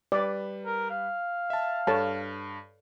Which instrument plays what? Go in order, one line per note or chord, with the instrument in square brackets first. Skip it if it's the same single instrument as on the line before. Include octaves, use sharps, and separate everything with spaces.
[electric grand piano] G3 B4 [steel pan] D5
[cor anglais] A#4
F5
[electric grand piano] E5 A5
[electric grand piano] G2 [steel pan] A4 C#5 A5